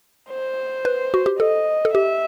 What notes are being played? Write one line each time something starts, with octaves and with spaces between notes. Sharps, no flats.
C5
B4
F#4
G4
A4 D#5
A4
G4 E5